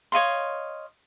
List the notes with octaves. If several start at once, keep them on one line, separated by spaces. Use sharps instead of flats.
C#5 D#5 F5 C6